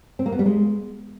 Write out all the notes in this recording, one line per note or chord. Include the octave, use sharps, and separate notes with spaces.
C4
A#3
B3
G3
G#3